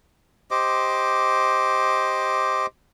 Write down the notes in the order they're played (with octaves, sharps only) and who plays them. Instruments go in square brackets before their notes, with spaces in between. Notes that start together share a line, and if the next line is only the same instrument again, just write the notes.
[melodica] G4 C5 D#5 D6